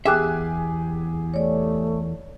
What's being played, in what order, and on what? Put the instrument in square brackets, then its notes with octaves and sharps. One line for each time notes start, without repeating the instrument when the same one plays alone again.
[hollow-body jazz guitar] E2 E5 [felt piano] G4 G#4 G#5 [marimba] G5 D6 F#6
[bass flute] A3 [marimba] C#5 D5